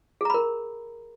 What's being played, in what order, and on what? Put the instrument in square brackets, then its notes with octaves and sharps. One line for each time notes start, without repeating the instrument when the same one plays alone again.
[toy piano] G#4
A#5
B5
A#4